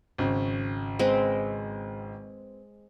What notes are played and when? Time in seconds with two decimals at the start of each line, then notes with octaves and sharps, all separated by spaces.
0.18 G#1 C#3
0.99 G#3 C4 B4